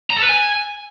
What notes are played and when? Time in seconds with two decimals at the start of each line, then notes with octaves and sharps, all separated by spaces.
0.10 A#5
0.17 A4
0.23 B4
0.29 G#5